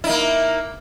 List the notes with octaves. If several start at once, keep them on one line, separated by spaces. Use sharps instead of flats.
A#3 D#4 E4